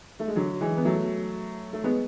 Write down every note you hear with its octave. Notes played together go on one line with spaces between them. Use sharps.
A3
G#3
D3 F#3
E3 G#3
B3
F#3 A3
A3
G#3 B3